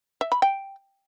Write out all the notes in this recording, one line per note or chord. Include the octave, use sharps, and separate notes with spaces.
E5
B5
G5